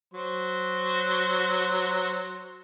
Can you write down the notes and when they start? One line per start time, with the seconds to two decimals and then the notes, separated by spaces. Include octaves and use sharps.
0.14 F#3 C5